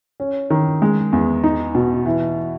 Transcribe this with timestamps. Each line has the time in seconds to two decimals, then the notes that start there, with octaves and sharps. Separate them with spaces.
0.20 C#4
0.50 D#3
0.82 G#3
1.13 E2
1.44 D#4
1.75 B2
2.06 E3